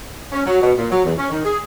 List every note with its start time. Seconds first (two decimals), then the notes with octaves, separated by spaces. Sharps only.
0.32 C#4
0.46 F#3
0.61 B2
0.78 A#2
0.91 F#3
1.05 E2
1.17 C#4
1.30 D#3
1.45 G#4